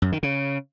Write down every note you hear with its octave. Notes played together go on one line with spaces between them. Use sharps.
F#2
D#3
C#3